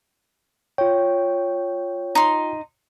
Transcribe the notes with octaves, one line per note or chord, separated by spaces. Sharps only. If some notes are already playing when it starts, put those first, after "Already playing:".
F4 C#5 G5
D#4 C6